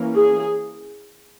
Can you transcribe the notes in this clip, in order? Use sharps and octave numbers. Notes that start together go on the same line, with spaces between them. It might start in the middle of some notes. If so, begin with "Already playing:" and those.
Already playing: E3 A#3 C#4
G#4